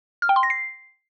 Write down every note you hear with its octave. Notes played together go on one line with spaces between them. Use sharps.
F6
G5
C6
A#6
C7